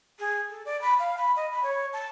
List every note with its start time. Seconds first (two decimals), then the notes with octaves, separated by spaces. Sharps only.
0.19 G#4
0.49 A4
0.65 D5
0.81 B5
0.99 F5
1.17 B5
1.36 D#5
1.51 B5
1.63 C#5
1.93 A5